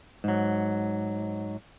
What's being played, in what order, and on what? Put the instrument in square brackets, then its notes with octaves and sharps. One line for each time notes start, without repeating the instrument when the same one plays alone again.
[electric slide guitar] G#2 F#3